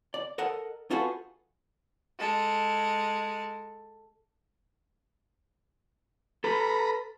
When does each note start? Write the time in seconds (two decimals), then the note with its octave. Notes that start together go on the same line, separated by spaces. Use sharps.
0.14 D5
0.38 A4 A#4 D#5 F#5
0.90 D#4 F4 F#4 G#4 A4 B4
2.19 G#3 A4
6.44 A4 B4 A#5 B5